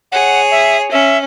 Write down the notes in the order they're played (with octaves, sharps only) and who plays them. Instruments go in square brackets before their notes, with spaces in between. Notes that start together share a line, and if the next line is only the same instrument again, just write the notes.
[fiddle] G#4 C#5 [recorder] F#5
[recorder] E5
[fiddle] C#4 [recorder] E5